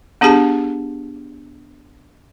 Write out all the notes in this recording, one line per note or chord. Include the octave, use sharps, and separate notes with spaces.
B3 D4 G4 G#4 A5